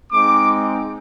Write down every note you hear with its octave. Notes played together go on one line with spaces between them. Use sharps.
G#3 C4 D#4 D6